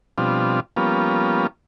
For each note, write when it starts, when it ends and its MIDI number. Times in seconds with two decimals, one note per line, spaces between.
0.18 0.60 47
0.18 0.60 53
0.18 0.60 55
0.18 0.60 60
0.18 0.60 62
0.18 0.60 65
0.76 1.47 53
0.76 1.47 55
0.76 1.47 58
0.76 1.47 59
0.76 1.47 61
0.76 1.47 65